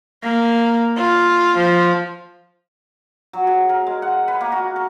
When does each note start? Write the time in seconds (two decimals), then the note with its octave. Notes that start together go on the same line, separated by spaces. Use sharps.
0.23 A#3
0.97 F4
1.56 F3
3.33 F#3
3.47 G#4
3.69 A#4
3.87 G#3
4.02 F#5
4.28 B4
4.41 A#3
4.52 F#4
4.76 A#4